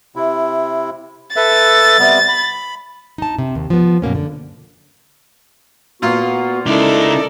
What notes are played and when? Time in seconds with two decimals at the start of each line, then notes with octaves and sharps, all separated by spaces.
0.16 C3 E4
1.36 A4 B4 E5 A6
1.99 C3 G3 B3
2.28 B5
3.18 D#4 A5
3.38 C3
3.55 D#2
3.70 F3 B3
4.02 F#2 B2 A#3 C#4
4.15 D3
6.02 A#2 B3 F4 F#4
6.66 C#3 G#3 D#4 E4 A4 A#4 D5